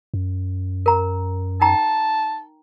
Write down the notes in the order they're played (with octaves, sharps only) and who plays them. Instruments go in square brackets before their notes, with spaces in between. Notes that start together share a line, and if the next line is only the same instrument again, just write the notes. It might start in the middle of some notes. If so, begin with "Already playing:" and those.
[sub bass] F#2
[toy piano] A#4 A#5
[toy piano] D#4 G5 A#5 [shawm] A5